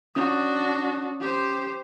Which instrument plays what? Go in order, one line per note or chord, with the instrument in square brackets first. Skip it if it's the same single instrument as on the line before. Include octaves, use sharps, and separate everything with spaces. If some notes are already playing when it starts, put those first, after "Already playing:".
[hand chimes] C#4 D#6 [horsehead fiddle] D4 F#4
[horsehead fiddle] G4 C5